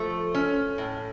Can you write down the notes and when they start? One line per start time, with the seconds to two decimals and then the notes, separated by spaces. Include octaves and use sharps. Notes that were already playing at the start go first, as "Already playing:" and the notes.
Already playing: F3 A3
0.34 C#4
0.78 A2